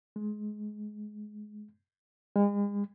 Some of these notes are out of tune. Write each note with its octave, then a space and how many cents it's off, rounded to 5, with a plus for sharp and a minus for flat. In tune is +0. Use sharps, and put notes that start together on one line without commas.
G#3 +20
G#3 -40